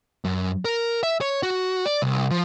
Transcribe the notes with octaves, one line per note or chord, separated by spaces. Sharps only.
F#2
A#4
E5
C#5
F#4
D5
C2
F3